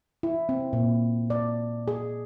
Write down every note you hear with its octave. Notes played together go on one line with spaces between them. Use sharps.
E4
C4
A#2
D5
G#4